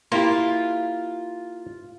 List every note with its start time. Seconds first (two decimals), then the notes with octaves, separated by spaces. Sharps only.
0.12 A#3 E4 F4 G4